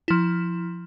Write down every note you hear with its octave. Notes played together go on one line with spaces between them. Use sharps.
F3 E4